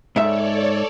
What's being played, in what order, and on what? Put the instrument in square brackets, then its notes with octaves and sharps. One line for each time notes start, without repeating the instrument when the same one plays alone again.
[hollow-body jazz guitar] G#2 E5 [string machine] A4 C#5 D5